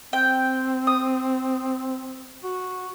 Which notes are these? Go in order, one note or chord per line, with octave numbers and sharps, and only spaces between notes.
C4 G5
D#6
F#4